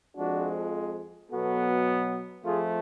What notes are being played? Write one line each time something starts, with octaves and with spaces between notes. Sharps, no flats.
F2 F3 G#3 D4 F#4
B2 F#3 B3 F#4 A4
F2 F3 A3 F4 G#4